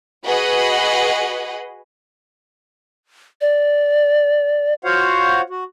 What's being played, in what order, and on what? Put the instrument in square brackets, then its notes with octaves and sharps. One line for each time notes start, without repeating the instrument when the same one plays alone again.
[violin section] F#4 G#4 B4 D#5 F#5
[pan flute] D5
[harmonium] F4 F#4 C5 C#5 F5 F#5
F#4